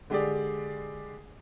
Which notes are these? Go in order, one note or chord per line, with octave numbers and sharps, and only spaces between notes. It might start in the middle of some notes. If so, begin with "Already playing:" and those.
D3 G#3 G4 G#4 D5